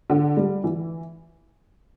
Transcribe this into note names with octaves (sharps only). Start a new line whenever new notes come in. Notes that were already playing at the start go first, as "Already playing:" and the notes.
D3
G3
E3